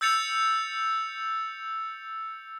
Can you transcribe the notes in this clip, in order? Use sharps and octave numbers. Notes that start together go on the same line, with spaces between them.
E6 G6 A6 C#7 F7